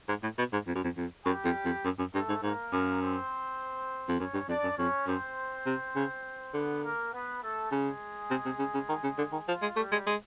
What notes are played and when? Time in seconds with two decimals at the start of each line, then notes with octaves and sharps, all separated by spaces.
0.08 G#2
0.23 A2
0.38 B2
0.53 G#2
0.67 F2
0.75 F#2
0.84 F2
0.97 F2
1.25 F#2 G3 G4
1.45 F2
1.65 F2
1.84 F#2
1.99 F#2
2.14 G2 A3 A4
2.29 G#2
2.43 G#2 A#3 A#4
2.72 F#2
3.02 C4 C5
4.08 F2
4.19 F#2 C#4 C#5
4.34 G2
4.48 F2 D4 D5
4.63 F#2
4.78 F2 C#4 C#5
5.07 F#2 C4 C5
5.66 C3
5.96 C#3
6.54 D3 B3 B4
6.83 A#3 A#4
7.13 B3 B4
7.42 A3 A4
7.71 C#3 G#3 G#4
8.30 C3
8.45 C3
8.59 C#3
8.74 C#3
8.89 D#3
9.03 C#3
9.18 D3
9.32 D#3
9.48 F3 F4
9.62 G#3
9.76 G3 A3 G4
9.92 G#3
10.07 G#3